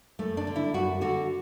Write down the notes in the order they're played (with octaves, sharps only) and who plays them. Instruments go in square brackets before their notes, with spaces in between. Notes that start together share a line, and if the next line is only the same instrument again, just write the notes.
[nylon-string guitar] F#2 A3
D4
D3
E4
F#2 F#4
D3 F#4